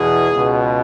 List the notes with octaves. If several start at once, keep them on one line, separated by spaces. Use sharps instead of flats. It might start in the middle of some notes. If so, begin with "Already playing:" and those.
Already playing: E2 B2 G#4
C#2 B2